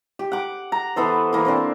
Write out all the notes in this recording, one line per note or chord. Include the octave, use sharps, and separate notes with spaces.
G4
F#5 D6
A#5
E3 B3 A4 C5
E3 A#3
A#3 C4 D4